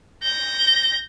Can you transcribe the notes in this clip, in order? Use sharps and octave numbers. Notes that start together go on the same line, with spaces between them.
G6 A#6